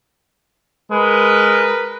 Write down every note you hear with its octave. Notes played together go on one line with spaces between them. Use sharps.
G#3 A#4 B4